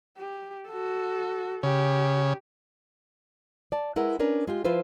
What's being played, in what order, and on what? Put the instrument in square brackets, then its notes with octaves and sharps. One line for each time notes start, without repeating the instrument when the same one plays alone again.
[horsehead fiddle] G4
F#4 A4
[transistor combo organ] C#3 [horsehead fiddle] G4
[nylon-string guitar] D5 A5
G#3 E4 A#4 B4 F#5
C#4 D4 A#4 B4
G#3 F4 G4
F3 E4 F4 B4 C5